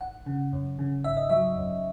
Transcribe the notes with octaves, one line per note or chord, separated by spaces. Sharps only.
G#1 F#5
C#3
F#2
C#3
G#1 E5
D#5
F#3 E5
F#2